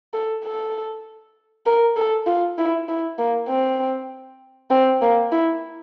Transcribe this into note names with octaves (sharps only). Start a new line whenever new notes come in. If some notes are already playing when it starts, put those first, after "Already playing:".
A4
A4
A#4
A4
F4
E4
E4
A#3
C4
C4
A#3
E4